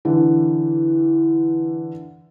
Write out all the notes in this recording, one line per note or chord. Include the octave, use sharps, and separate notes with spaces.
D3 E3